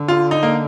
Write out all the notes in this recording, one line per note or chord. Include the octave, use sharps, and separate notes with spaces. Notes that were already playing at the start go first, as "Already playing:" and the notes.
Already playing: D3
F4
D#4
A#3